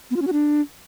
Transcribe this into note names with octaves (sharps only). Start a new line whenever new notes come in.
B3
F4
C#4
F#4
D4